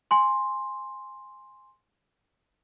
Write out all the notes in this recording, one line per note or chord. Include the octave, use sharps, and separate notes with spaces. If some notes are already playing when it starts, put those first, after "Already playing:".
G#5 C6